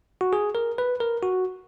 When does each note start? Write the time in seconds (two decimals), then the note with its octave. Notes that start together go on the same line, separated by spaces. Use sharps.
0.21 F#4
0.33 G#4
0.55 A#4
0.78 B4
1.00 A#4
1.23 F#4